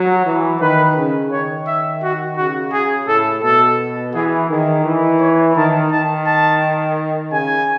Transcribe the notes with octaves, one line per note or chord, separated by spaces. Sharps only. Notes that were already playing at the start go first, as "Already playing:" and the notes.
Already playing: F#3
E3
D#3 B4
C#3
D#3 C#5
E5
F#4
C#3 F#4
G#4
A2 A4
B2 A4
E3 G#4
D#3 G#4
E3
C#5
D#3 A5
D#3 A5
A5
C#3 G#5